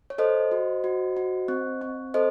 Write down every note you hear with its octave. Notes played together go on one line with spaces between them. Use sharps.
C#5
A4 C5 D#5
F#4
F#4
F#4
C4
C4
A4 C5 D#5